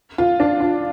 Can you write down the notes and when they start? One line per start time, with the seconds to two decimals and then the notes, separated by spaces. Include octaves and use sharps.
0.18 F4
0.40 D4
0.60 F4